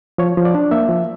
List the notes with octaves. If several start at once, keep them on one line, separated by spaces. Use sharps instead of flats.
F3 C#5
F3
D5
D4
A#3 E5
F3